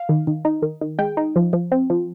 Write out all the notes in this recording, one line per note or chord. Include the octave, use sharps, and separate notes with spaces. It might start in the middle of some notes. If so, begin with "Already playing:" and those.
Already playing: F5
D#3
D#3
D#4
D#3
D#3
G#3 G5
D#4
F3
F3
C4
F3